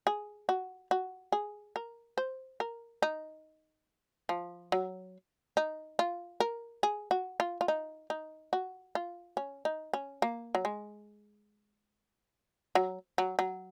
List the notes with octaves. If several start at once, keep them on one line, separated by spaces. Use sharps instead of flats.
G#4
F#4
F#4
G#4
A#4
C5
A#4
D#4
F3
F#3
D#4
F4
A#4
G#4
F#4
F4
F4
D#4
D#4
F#4
F4
C#4
D#4
C#4
A#3
F#3
G#3
F#3
F#3
F#3